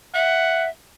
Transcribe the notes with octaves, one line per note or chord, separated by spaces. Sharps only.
E5 F#5